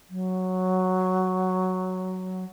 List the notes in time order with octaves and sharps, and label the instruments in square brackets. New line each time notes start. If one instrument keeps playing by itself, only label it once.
[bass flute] F#3